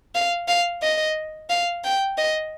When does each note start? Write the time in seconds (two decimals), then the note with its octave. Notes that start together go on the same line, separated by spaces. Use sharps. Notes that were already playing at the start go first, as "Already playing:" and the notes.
0.15 F5
0.48 F5
0.82 D#5
1.50 F5
1.84 G5
2.18 D#5